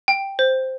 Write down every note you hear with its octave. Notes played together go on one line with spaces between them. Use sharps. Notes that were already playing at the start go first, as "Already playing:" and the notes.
G5
C5